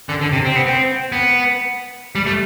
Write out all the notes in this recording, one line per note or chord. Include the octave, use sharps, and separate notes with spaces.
D3
D3
C3
C4
B3
C4
B3
G3
A3